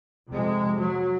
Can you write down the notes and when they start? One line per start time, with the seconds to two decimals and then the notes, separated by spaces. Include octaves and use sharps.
0.30 F2 C3 G#3
0.79 F#3